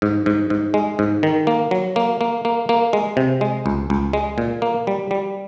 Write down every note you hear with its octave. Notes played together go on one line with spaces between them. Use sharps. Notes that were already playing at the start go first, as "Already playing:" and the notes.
G#2
G#2
G#2
G#3
G#2
D#3
A#3
F#3
A#3
A#3
A#3
A#3
G#3
C3
G#3
C#2
C#2
G#3
A#2
A#3
G3
G3